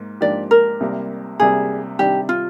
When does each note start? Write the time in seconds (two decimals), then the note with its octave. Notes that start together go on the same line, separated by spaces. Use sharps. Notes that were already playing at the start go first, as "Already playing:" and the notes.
Already playing: G#2 A#3
0.21 G#2 F3 A#3 D4 G4 D5
0.51 A#4
0.80 C2 C3 G3 A#3
1.39 C2 C3 G3 A#3 G#4
1.99 C3 D#3 G3 D4 G4
2.29 F4